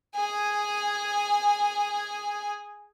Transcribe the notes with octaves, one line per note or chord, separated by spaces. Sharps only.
G#4 G#5